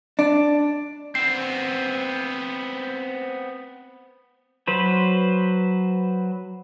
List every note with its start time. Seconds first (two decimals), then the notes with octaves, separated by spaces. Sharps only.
0.19 D4
1.15 B3 C4 C7
4.67 F#3 B4 C5